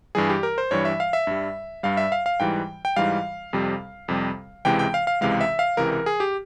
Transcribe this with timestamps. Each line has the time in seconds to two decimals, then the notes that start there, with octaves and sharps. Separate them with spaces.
0.15 G2 E3 G3 G#4
0.30 G4
0.43 A#4
0.58 C5
0.71 G2 E3 G3 C#5
0.85 E5
1.00 F5
1.13 E5
1.27 G2 G3
1.83 G2 G3 F5
1.97 E5
2.12 F5
2.26 F5
2.40 G#2 E3 G3 G5
2.85 G5
2.96 G#2 E3 G3 F5
3.53 F2 C3 G3
4.08 F2 C3 G3
4.65 C#2 C3 E3 G#3 G5
4.79 G5
4.94 F5
5.07 F5
5.21 C#2 C3 E3 G#3 F5
5.41 E5
5.59 F5
5.77 C#2 C3 E3 A#4
5.92 A#4
6.06 G#4
6.20 G4